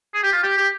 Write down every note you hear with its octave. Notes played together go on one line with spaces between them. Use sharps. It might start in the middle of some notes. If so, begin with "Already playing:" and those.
G#4
G4
F4
G4
G4